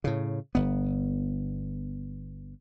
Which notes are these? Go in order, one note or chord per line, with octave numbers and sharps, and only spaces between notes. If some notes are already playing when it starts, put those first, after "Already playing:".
A2 C#3
G1 B3